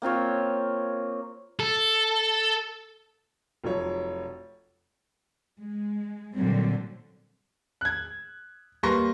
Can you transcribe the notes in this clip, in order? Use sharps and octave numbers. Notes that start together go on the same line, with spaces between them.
A#3 C4 F4 C#5
A4
F1 F3 F#3 C#5
G#3
A#2 D3 F#3 G3 C4
F#6 G#6
G3 A#3 B4 C6 C#6 A#6